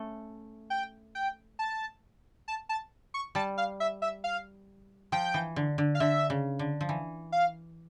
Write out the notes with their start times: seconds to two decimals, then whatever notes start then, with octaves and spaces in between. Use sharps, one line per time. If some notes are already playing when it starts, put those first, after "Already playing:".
Already playing: A3 C#4
0.70 G5
1.15 G5
1.59 A5
2.48 A5
2.69 A5
3.14 C#6
3.35 G3 A5
3.58 F5
3.80 E5
4.02 E5
4.24 F5
5.12 F3 G5
5.34 E3
5.56 D3
5.78 D3
5.95 F5
6.00 D3 E5
6.30 C#3
6.59 D3
6.81 F3
6.89 E3
7.32 F5